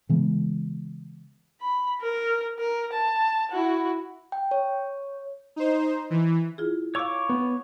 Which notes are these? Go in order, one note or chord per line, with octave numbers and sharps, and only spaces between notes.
C#3 E3 G#3 B3
B5
A#4
A#4
A5
E4 F#4
G5
C#5
D#4 C5
E3
E4 F4 G#4
C#5 F5 C#6 D6 E6
B3